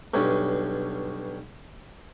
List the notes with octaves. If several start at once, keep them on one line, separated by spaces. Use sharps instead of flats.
B1 G2 C#4